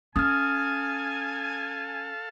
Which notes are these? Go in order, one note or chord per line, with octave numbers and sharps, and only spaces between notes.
C#4 A4 F5 G#5 A5 D#6 F6